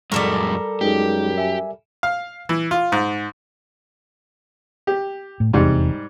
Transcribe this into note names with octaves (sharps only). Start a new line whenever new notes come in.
F#2 G3 G#3 A4 A#4 C#6
F#2 G#3 D#4 G4 G#4
E5 G#5
F5
E3
F4
G#2
G4
A2
F1 E2 G#2 C3 G3